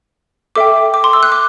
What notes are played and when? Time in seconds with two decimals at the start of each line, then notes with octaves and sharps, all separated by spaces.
0.55 A4 E5 G5 D6
0.94 D6
1.04 C6
1.13 E6
1.23 F#6
1.32 D6